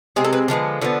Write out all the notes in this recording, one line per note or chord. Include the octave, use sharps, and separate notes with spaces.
C3 G#3 C4 G#4
A4
B4
D3 F3 G#3 B3
D3 F3 B3